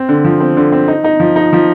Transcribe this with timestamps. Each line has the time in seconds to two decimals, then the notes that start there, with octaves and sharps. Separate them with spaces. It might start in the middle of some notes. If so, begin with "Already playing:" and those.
Already playing: C4
0.09 D3
0.24 F3
0.40 C4
0.57 D3
0.72 C4
0.88 D#4
1.04 D#4
1.20 F3
1.36 D#4
1.53 F3